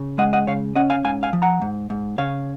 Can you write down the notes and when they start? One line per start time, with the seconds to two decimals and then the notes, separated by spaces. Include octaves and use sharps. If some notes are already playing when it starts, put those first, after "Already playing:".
Already playing: C#3
0.18 G#3 D#5 F#5
0.33 D#5 F#5
0.47 C#3 C#5 F5
0.76 C#4 D#5 F#5
0.90 F5 G#5
1.04 G#2 F5 G#5
1.23 F5 G#5
1.33 F3
1.42 F#5 A#5
1.62 G#2
1.90 G#2
2.18 C#3 C#5 F5